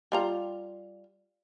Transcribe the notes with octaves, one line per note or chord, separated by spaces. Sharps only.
G3 F4 A#5